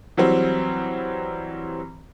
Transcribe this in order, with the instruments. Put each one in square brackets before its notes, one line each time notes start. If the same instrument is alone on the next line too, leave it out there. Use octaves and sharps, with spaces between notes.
[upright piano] E3 F#3 G3 C4